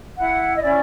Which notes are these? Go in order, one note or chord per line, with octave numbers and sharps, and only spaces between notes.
E4 F#5
D#5
C#4 D5